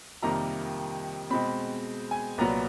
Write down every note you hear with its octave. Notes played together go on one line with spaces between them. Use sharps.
F2 C3 D#3 G3 A#3 A#5
B2 G#3 C4 B5
G#5
C2 A#2 F#3 B3 A#5